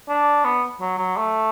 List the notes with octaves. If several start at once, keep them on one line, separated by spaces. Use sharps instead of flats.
D4
B3
F#3
F#3
A3